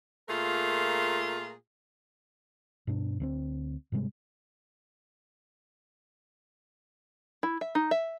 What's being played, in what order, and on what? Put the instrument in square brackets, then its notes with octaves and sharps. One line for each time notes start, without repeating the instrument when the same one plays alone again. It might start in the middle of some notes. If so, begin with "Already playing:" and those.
[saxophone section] A#2 A3 F4 G#4 A#4
[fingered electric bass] G2 B2 D4
D2 A3 C4
G#2 C3 G3 G#3
[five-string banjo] E4
E5
D#4
E5